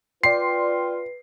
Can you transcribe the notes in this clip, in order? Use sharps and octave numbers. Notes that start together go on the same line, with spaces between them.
F4 B4 D5 G5 C6 C7